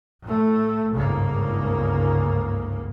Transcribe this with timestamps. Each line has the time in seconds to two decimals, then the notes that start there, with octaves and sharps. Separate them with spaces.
0.23 A2 A3
0.93 G1 C#2 G#2 C#3 A#3